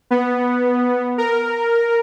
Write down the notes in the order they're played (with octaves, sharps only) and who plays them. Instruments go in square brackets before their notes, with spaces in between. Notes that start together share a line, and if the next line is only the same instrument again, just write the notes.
[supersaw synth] B3
A#4